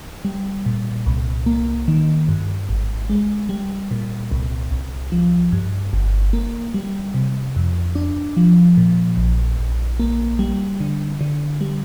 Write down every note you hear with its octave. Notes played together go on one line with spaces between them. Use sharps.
G3
A#2
C2
A#3
D#3
G2
G#1
G#3
G3
A#2
C2
C2
F3
G2
G1
A#3
G3
C3
F2
D4
F3
A#2
A#1
A#1
A#3
G3
D3
D3
G3